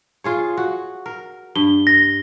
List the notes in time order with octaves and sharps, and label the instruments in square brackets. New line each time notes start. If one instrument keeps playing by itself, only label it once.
[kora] F4 G#4 C#5
F#4
A#4
[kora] G2 [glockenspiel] G7
[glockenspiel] A#6